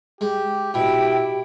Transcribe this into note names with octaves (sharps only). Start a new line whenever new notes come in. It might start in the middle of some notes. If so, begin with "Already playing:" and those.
G#3 G4
B2 E4 G4 G5